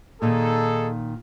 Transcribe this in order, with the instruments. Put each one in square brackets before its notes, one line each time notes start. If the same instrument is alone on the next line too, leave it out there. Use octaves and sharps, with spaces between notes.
[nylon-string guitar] A#2 D#3 [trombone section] D#4 G#4 A4